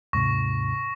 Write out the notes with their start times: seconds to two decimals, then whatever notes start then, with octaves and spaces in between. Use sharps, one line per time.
0.13 D#2 G#2 C3 C#6 A#6